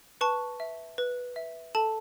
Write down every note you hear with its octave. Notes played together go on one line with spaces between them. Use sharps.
B4 A5 C#6
E5
B4
E5
A4 A5